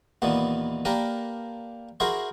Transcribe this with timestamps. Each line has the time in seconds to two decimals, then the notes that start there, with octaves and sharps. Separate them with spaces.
0.22 D#2 A#2 E3 B3
0.85 A#3 D4 G4 A#4 B4
2.00 E4 F#4 G#4 A#4 C5